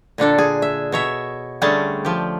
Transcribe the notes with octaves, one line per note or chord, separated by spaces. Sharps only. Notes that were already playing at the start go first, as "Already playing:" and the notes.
A#2 D3 D4 A4
G#4
E5
B2 C#5 E5
D3 G3 A3 C#4 G#4 A5
F3 G4